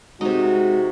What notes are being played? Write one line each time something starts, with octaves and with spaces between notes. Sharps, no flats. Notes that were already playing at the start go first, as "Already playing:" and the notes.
C3 G#3 D#4 F#4